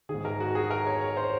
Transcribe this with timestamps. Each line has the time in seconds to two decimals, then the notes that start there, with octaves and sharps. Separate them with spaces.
0.09 G#2 D#3 G#4
0.25 A#4
0.40 F#4
0.55 G#4
0.71 A#4
0.86 C#5
1.01 C#5
1.17 C5